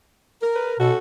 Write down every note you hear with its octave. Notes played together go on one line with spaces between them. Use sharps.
A#4
B4
B2 C#4 F#4 A4